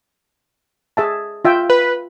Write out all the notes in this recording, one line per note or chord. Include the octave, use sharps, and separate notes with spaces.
G#4 E5 A5
F4 E5 G5
B4